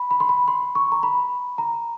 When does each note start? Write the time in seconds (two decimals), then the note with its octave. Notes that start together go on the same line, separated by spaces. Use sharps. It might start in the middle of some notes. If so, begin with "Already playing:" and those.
Already playing: B5
0.11 B5
0.20 C6
0.29 B5
0.48 C6
0.75 C#6
0.92 A#5
1.03 B5
1.58 A#5